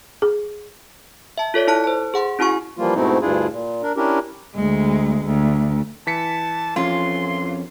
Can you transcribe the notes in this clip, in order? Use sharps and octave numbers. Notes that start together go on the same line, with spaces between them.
G#4
E5 A5
F4 A4 C#5 D5
E4 A4 A5 F#6
C5 A5
G#4 F#5 C6
C#4 E4 F#4 G#5 C#6
E3 F3 G3 A#3 F4
G#2 B2 A3 C4 D#4 E4
D2 G2 D4 E4 F4 G#4
A#2
D4 A#4
C#4 D4 E4 G4 A#4
D2 G#3
D2
E3 A5 B6 C#7
F2 C#4 F4 C6